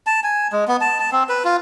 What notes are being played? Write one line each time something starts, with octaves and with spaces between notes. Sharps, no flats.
A5
G#5
G#3
B3
A5
A5
C4
B4
F4